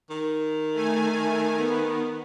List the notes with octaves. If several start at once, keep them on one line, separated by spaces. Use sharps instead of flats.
D#3
A3 G#5
B3